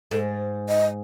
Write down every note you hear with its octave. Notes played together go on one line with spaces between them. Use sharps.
G#2 A4
D#5